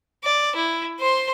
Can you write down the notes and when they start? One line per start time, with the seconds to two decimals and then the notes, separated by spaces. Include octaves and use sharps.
0.24 D5
0.55 E4
1.00 C5 C6